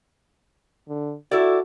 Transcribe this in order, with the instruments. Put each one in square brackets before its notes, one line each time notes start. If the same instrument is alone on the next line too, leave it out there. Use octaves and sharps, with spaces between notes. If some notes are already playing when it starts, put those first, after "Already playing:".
[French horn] D3
[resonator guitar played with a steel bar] E4 A4 D5 [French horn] F#4